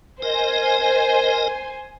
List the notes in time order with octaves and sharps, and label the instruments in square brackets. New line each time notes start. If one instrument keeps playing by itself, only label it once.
[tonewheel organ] A#4 D#5 [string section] C5 G#5